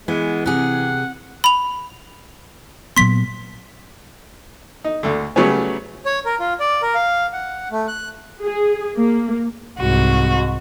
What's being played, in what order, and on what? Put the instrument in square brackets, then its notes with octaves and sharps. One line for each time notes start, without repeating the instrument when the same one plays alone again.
[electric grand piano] E3 [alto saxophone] G#3 [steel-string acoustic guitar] B3
[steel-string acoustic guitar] C3 G#4 [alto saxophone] F#5
[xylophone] B5 F7
[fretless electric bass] A#2 F#3 B3 [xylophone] C6 B6
[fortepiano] D#4
D2 D3
C#3 F#3 G3 A3 B3 C#4
[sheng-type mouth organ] C#5
A#4
F4
D5
A#4
F5
F#5
A3
F#6
[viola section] G#4
A#3
[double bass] C2 [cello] G#2 F#4